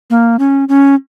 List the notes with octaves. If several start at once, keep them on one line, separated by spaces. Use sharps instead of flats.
A#3
C#4
C#4